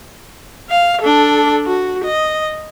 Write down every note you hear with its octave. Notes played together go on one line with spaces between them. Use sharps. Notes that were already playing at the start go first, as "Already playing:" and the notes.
F5
D4 A4
F#4
D#5